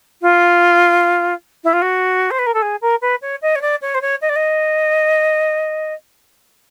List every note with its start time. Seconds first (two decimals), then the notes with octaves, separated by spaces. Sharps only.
0.22 F4
1.64 E4
1.73 F4
1.82 F#4
2.31 C5
2.39 B4
2.46 A#4
2.54 A4
2.62 G#4
2.81 A#4
3.01 B4
3.22 C#5
3.42 D#5
3.55 C#5
3.61 D5
3.82 C#5
3.94 C5
4.01 C#5
4.21 D#5
4.29 D5
4.36 D#5